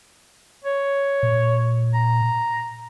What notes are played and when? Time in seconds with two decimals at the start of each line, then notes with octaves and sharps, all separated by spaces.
0.64 C#5
1.23 A#2
1.94 A#5